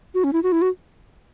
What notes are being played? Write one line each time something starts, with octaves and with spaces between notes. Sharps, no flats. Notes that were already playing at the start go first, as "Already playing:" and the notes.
F#4
C#4
E4
F#4
E4
F#4